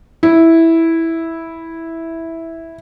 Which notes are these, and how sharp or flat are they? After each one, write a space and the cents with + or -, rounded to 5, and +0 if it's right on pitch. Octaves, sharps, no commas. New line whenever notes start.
E4 -5